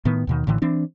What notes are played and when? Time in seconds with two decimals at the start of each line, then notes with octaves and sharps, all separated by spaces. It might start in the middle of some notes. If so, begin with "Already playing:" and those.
0.05 A2 D#3 B3
0.27 D#2 B2 D#3
0.47 A1 A2 D3 E3
0.62 E3 C4 D4